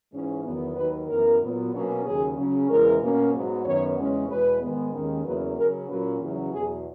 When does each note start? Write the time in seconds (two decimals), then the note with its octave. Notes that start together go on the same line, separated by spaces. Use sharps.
0.12 G#2 E3 G#3 C#4
0.44 E2 D#3 F#3 B3
0.76 D#2 D#3 F#3 B4
1.09 F#2 E3 B3 A#4
1.40 A#2 F#3 B3
1.72 B2 F#3 A#3 C#4
2.05 D#2 C#3 F#3 G#4
2.37 C#3 F#3 C#4
2.69 E2 C#3 E3 G#3 A#4
3.01 B2 A#3 C#4
3.33 G#2 F#3 B3
3.65 F#2 D#3 F#3 B3 C#5
3.97 E2 C#3 G#3 C#4
4.29 E2 B2 G#3 B3 B4
4.61 G#2 D#3 G#3 B3
4.93 D#2 D#3 G#3 C#4
5.25 E2 C#3 F#3 A#3 B4
5.57 C#3 F#3 C#4 A#4
5.88 A#2 F#3 A#3 C#4 B4
6.21 E2 C#3 F#3
6.53 E2 B2 F#3 G#4